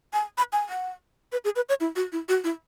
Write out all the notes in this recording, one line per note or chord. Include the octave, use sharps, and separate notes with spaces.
G#5
B5
G#5
F#5
B4
G#4
B4
C#5
E4
F#4
E4
F#4
E4